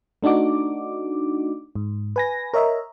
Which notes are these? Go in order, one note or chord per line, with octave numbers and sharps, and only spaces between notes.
A3 D4 D#4 F#4 D6
G#2
B4 G#5 A#6
A#4 C#5 D#5 E5 A#5